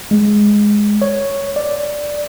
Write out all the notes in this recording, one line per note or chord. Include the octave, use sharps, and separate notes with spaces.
G#3
C#5
D5